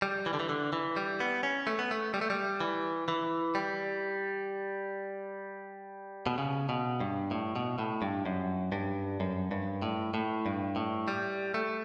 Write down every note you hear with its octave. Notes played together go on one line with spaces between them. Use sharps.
G3
E3
D3
E3
D3
E3
G3
B3
C#4
A3
B3
A3
G3
A3
G3
E3
E3
G3
B2
C#3
B2
G2
A2
B2
A2
G2
F#2
G2
F#2
G2
A2
A2
G2
A2
G3
A3